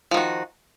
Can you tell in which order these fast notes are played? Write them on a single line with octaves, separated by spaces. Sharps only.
F3 D#3 F#4